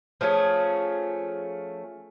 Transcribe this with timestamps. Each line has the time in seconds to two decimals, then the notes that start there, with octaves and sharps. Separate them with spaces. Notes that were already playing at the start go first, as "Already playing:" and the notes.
0.21 F3 A3 C#4 G#4